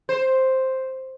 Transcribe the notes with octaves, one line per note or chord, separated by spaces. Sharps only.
C5